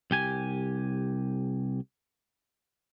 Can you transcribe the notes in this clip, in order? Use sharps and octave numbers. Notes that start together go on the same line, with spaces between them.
C2 G4 G#5